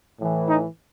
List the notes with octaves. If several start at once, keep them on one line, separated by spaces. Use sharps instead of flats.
A2 E3
D#4